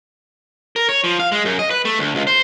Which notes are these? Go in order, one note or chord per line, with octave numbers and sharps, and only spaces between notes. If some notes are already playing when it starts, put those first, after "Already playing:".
A#4
C#5
F3
F5
G#3
F#2
D#5
B4
A3
D2
C#2
C5